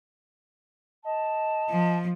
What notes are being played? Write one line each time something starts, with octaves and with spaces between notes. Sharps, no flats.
D#5 A5
F3